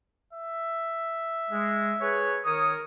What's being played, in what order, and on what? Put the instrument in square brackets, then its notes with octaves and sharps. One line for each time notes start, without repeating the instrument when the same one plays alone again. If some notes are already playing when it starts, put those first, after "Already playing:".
[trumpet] E5
[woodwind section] G#3
G#4 B4 C#5
[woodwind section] D#3 C#5 D#6 [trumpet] A#4